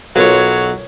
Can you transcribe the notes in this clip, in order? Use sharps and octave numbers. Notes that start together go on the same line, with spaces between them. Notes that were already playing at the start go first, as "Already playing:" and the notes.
B1 F#3 F4 A#4 B4 C#5